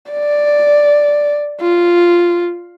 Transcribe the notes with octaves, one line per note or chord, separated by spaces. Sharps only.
D5
F4